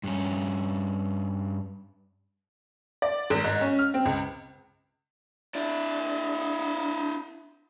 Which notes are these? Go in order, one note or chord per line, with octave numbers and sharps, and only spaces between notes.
G2 C#4
D5
G#1
G#2
C#4
F6
C4
C#2
D4 E4